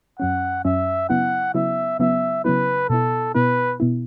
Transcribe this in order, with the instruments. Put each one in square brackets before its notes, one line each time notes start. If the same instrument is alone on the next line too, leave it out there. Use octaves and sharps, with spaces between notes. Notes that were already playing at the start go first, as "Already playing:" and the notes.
[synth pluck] F#2 F#3 C#4 [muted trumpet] F#5
[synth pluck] F#2 F#3 C#4 [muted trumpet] E5
[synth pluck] C#3 F#3 B3 E4 [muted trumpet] F#5
[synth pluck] C#3 F#3 B3 E4 [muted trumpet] E5
[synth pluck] C#3 F#3 B3 E4 [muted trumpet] E5
[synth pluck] C#3 F#3 B3 E4 [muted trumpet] B4
[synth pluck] B2 B3 E4 [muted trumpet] A4
[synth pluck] B2 B3 E4 [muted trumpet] B4
[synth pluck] B2 B3 E4